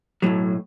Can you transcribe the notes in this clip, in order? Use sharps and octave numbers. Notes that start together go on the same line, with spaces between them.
B1 A2 F#3